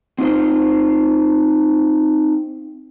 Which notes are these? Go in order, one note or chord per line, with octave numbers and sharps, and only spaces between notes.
C4 D#4 F4 C5